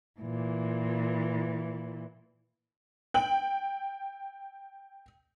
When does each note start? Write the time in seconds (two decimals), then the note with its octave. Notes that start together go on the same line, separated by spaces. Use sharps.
0.20 A#2 E3
3.14 G5 F#7